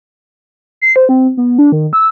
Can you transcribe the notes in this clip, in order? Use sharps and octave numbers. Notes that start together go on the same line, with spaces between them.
C7
C5
C4
B3
D4
D#3
E6